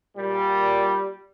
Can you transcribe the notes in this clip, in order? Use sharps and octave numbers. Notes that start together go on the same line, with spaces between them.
A#2 G3